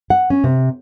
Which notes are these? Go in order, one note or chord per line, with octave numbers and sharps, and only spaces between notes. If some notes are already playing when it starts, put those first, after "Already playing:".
F#5
C#4
C3